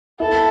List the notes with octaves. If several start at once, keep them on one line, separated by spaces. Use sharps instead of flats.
E4 A4